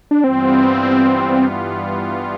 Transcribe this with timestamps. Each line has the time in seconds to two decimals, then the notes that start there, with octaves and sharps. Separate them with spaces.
0.11 D4
0.24 G2 E3 G3 B3 C4 F4